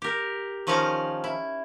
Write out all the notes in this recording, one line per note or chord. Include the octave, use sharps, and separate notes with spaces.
G4 A#4
D#3 F3 C#4 F4 F5 A#5
E4